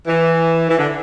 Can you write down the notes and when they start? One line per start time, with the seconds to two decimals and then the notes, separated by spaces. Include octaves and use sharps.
0.07 E3
0.69 E3
0.79 D3